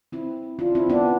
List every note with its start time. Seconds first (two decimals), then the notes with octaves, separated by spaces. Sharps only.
0.12 C4 E4
0.59 D4 F4
0.75 C4 E4
0.90 B3 D4